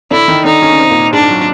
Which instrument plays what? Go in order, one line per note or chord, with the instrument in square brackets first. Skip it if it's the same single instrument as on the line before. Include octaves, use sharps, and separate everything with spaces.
[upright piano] D3 D4 [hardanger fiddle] E4
[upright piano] D#3 D#4
[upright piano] D3 D4 [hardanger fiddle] D#4
[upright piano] C#3 C#4
C#4
C3 C4
A#2 A#3
[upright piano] G#2 G#3 [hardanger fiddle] D4
[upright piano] F#3